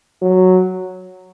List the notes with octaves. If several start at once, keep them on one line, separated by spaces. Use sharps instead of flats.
F#3